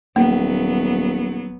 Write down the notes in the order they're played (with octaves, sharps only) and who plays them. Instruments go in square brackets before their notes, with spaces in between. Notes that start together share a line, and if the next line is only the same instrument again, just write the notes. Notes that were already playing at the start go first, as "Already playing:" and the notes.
[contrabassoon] D#1 [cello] F#3 B3 [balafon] A#3